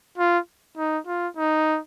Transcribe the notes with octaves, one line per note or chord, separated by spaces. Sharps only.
F4
D#4
F4
D#4